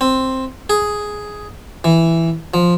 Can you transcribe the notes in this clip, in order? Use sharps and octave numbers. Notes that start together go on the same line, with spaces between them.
C4
G#4
E3
F3